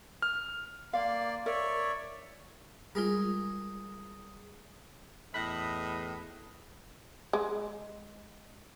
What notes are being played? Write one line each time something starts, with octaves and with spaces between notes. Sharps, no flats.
F6
A#3 D5 F5 C6
A#4 C#5 D5 E5
G3 G#3 F4 G#4 A#4
E2 A2 D#5 B5 F#6 A#6
G#3